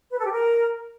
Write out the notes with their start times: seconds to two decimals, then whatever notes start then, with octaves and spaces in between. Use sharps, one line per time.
0.12 B4
0.19 A4
0.26 G4
0.33 A#4